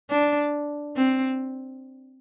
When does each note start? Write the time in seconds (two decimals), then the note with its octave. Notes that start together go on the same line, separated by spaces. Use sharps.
0.10 D4
0.97 C4